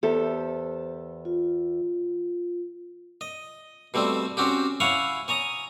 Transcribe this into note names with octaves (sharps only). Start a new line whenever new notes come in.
E2 G4 A4 C5
F4
D#5
B2 G3 A3 C4
C4 C#4 F#4 G4
E4 C#5 F5 F#5 G#5 C#6
C#5 G#5 A#5 D#6